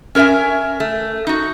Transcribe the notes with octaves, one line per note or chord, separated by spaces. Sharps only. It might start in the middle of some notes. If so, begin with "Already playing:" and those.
C#4 A#4 C5 E5 G#5
A3
D#4 F#4